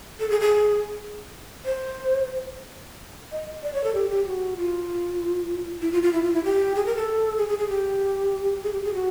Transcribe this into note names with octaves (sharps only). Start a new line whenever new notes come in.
A4
G#4
G#4
C5
D#5
D5
C#5
A4
G4
G4
F#4
F4
E4
F4
F4
E4
F4
E4
G4
G#4
A#4
A4
G#4
G#4
G#4
G4
G#4
G4
G#4
F#4